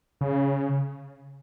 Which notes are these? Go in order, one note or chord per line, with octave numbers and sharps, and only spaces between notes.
C#3